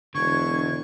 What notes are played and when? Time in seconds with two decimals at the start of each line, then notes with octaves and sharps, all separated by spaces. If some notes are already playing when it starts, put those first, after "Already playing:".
0.15 E1 D3 C#6 G#6